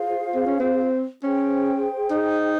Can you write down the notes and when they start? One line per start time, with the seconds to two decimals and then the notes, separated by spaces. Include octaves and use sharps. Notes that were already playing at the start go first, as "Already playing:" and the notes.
Already playing: F4 G#4 C5 F5
0.35 C4
0.47 C#4
0.60 C4
1.23 C#4 G#4 C5 G5
2.11 D#4